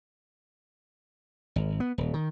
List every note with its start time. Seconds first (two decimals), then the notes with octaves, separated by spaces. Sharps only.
1.56 G#1
1.80 B3
1.98 D#1
2.14 D#3